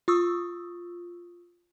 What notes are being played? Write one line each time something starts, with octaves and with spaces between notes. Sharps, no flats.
F4 C#6 D#6 E6